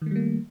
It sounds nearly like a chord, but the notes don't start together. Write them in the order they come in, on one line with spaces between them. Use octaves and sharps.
D#3 A3 G3 A#3